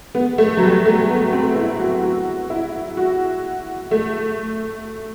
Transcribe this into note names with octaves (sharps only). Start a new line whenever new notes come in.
B3
A3
F#3
G3
A3
B3
C4
E4
F#4
F#4
E4
F#4
A3